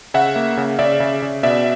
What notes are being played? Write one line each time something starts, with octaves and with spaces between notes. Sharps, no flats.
C#3 E5 F#5
A#3
C#3
C#3 D5 E5
C#3
C#3
B2 D5 E5